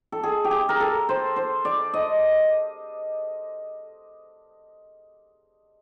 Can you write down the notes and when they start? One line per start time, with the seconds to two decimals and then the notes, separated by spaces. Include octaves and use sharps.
0.12 A4
0.23 G#4
0.45 G4
0.51 G#4
0.69 A#4
0.80 A4
1.09 C5
1.36 C5
1.65 D5
1.94 D#5